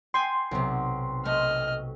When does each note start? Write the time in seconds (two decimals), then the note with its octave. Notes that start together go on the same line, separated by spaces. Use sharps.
0.14 G5 G#5 C6 D#6
0.51 B1 C3
1.25 A3 D#5 F6